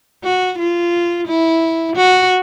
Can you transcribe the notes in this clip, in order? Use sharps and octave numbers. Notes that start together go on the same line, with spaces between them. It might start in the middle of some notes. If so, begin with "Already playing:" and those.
F#4
F4
E4
F#4